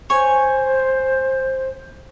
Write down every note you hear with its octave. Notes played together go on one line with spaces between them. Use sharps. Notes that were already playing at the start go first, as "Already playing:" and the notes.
C5 C#5 G#5